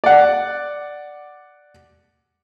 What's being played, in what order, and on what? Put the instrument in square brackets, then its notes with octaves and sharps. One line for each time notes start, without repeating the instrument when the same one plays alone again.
[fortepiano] D5 F#5